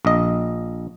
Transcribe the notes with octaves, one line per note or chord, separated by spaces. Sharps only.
A#1 D#5